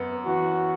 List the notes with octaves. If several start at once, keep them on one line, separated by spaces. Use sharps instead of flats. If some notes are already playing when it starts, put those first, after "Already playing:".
Already playing: F#2 B3
E3 F#4